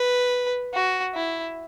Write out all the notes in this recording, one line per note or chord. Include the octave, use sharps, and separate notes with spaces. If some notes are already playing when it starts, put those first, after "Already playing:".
Already playing: B4
F#4
E4